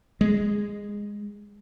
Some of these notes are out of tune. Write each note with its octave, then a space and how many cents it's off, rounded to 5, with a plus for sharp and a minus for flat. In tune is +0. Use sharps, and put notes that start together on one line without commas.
G#3 -15